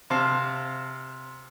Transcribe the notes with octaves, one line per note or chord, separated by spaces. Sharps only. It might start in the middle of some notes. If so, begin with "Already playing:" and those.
C3 C5 F5 A5